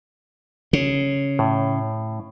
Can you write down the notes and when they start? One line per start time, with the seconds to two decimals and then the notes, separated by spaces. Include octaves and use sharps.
0.73 C#3
1.39 A2